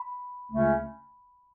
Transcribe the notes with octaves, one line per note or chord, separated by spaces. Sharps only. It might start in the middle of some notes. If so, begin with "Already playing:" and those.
Already playing: B5
C#2 C#3 A3 C#4